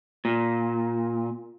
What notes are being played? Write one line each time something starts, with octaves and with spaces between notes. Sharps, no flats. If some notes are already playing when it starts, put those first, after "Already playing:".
A#2